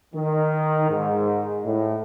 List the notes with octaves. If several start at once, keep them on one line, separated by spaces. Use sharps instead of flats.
D#3
G#2
A2